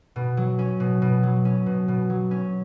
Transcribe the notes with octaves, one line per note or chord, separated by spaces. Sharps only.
B2
F#3
C#4
B2
B2
F#3
C#4
B2
B2
F#3
C#4